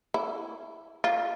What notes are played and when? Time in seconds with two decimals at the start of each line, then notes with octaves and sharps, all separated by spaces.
0.14 E4
1.04 F4